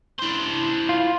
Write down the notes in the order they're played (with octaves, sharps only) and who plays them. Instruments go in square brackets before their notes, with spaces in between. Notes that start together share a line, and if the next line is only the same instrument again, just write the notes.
[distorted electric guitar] D4 C5 [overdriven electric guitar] E4 C6
[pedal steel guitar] F4